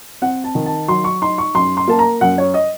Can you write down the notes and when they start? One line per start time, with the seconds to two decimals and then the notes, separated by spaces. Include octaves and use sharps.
0.22 C4 F#5
0.44 A5
0.55 D#3
0.66 A5
0.88 F#3 C6
1.04 C#6
1.22 D#4 C6
1.38 C#6
1.55 F#2 C6
1.77 C6
1.88 A#3 A5
1.99 A#5
2.21 F#2 F#5
2.38 C#5
2.54 D#5